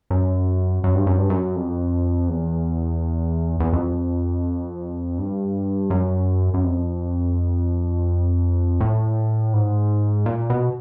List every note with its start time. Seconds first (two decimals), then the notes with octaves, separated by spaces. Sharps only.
0.10 F#2
0.84 F#2
0.95 G2
1.07 F#2
1.18 G2
1.30 F#2
1.56 F2
2.28 E2
3.60 E2
3.73 F2
5.18 G2
5.90 F#2
6.54 F#2
6.64 F2
8.80 A2
9.53 G#2
10.26 A#2
10.50 B2